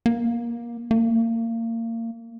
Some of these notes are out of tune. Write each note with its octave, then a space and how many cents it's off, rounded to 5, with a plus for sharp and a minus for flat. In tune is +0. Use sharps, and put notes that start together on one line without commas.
A#3 +20
A#3 -30